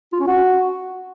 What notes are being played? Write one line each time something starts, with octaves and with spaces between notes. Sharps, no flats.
F4
C#4
F#4